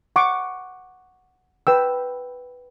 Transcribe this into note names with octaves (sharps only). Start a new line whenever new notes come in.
F#5 C#6 D6
B4 G5 E6